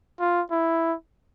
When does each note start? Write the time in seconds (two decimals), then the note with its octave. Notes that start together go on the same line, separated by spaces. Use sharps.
0.20 F4
0.51 E4